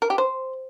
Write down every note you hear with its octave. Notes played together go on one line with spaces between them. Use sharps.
A#4
G4
C5